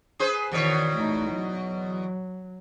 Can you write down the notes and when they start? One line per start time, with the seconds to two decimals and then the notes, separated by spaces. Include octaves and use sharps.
0.19 G#4 B4 C5
0.51 E2 B2 D#3 C#5
0.97 A3 D#4
1.31 F#3